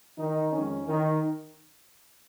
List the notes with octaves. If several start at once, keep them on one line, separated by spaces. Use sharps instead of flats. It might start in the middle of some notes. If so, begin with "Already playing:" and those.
D#3 D#4
F2 D#3 G#3 C#4
D#3 D#4